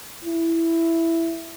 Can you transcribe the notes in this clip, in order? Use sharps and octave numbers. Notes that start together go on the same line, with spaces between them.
E4